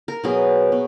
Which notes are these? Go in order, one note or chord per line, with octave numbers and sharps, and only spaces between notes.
A#4
B2 F#3 B3 G#4
B2